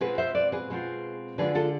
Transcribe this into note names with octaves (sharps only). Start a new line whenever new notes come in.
B2 G#3 C4 F4 G#4 B4
C5 E5
B4 D5
G#4 B4
B2 G#3 C4 F4
D3 G#3 D4 F4 G#4 B4
F4 A4